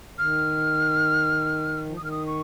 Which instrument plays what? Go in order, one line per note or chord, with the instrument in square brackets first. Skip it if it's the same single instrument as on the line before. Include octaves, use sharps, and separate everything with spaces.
[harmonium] D#3 [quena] F6
[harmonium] F3
[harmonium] D#3 [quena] D#6
[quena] F6
D#6
C#6